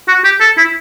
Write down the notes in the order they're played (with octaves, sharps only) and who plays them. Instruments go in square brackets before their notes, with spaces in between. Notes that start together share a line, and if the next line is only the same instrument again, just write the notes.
[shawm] F#4
G4
A4
E4